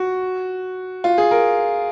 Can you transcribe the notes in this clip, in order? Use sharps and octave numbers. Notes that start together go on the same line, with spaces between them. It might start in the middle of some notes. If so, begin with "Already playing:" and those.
Already playing: F#4
F4
G#4
A#4